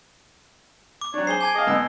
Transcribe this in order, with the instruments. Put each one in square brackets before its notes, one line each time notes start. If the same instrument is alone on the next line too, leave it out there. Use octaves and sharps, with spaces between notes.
[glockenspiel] D6
[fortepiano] F#3 D4 [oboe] C#5
[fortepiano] G#4 C5 [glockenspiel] C7 G7
[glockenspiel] G#5 A5 G#6 [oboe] D6
[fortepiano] G#4 F5 [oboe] D#5
[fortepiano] D2 B2 E6